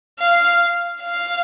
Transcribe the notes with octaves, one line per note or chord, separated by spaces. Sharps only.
F5
F5